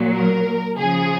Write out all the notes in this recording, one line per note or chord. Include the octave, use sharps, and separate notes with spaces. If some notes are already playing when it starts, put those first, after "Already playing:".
Already playing: A#2 F#3
A#4
C#3 F3 G#4